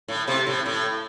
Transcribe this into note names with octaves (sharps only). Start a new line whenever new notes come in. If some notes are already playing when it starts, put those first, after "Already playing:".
A2
C3
A2
A2